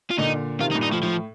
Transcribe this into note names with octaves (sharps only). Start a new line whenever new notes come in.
F4
A#2 D3 D#4
C3 D#3 F4
D#4
G2 A#2
D#4
A2 F3
A2 F3